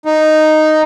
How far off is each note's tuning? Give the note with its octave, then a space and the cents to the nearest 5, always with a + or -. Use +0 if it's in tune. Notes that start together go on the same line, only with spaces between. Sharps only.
D#4 -5